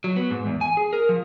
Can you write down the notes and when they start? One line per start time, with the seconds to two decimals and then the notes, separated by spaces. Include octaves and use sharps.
0.04 F#3
0.16 B3
0.31 G#2
0.46 E2
0.61 G#5
0.77 G#4
0.93 A#4
1.09 F3